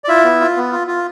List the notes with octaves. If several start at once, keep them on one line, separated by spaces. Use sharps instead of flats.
D5
E4 F4 E5
B3
F4
B3
F4
F4